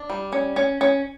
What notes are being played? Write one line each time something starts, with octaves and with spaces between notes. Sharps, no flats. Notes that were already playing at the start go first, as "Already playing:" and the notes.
Already playing: D4
G3
C#4
C#4
C#4